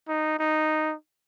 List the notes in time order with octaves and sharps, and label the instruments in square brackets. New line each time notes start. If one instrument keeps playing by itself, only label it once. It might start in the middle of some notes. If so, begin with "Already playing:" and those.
[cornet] D#4
D#4